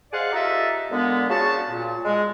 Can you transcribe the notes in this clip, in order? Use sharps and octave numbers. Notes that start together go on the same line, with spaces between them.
G#4 C5 D5 D#5 F5 F#5
D#4 F4 G4 A4 D#5 E5
A#2 D3 G#3 B3
C#3 F#4 A5
A#2
G#3